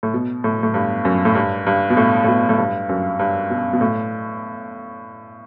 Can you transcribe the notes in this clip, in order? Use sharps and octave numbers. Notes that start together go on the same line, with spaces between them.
A2
B2
A2
A2
G2
F#2
A2
G2
G2
B2
A2
A2
B2
A2
G2
F#2
G2
B2
B2
A2